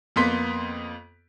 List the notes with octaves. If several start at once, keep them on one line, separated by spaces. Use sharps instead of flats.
F2 A#3 B3 C6 B6